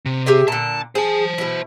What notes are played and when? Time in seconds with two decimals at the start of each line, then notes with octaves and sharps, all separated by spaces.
0.06 C3
0.26 G4 G#4 E5
0.48 A#2 D3 A5
0.95 G#4 C5 A5
1.38 B2 E4